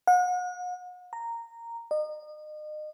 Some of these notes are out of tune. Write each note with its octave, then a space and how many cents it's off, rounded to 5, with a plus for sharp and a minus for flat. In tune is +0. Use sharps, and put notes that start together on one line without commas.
F#5 -40
A#5 -10
D#5 -35